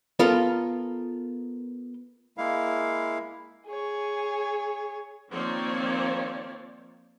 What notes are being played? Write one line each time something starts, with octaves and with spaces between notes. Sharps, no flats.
B3 F4 A4 A#4
G#3 A#3 E4 F5
G#4 C#5
D#3 F3 A#3 C4 C#5 D5